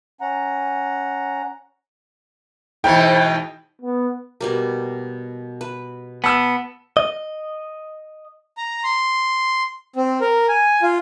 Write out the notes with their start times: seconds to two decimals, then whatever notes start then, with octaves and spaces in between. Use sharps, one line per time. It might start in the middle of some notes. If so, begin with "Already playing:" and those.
0.21 C#4 F#5 A#5
2.84 G#2 B2 E3 G5
3.82 B3
4.41 B2 G3 A#3
5.61 B4
6.24 B3 A5 E6
6.97 D#5
8.57 A#5
8.84 C6
9.96 C4
10.21 A#4
10.48 G#5
10.82 F4